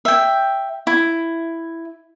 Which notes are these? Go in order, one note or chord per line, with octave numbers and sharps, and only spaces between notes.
E5 G5
E4